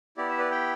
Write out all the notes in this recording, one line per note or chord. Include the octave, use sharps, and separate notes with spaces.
B3 E4 G4 D5
E5
B4 D5
G5 B5